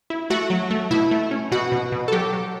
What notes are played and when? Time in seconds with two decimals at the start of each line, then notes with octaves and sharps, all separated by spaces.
0.10 E4
0.30 A3 F#4
0.50 F#3
0.71 A3
0.91 B2 E4
1.11 A3
1.31 C#4
1.51 B2 F#4
1.72 B2
1.92 B2
2.08 A4
2.12 F#3 G4
2.33 F#3